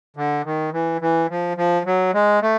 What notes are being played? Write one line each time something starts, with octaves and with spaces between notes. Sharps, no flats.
D3
D#3
E3
E3
F3
F3
F#3
G#3
A3